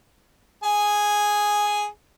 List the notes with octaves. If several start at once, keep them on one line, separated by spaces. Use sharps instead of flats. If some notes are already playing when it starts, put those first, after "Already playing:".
G#4 G#5